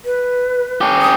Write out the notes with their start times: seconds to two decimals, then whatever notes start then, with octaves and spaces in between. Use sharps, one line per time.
0.05 B4
0.81 C#4 G4
1.02 D#6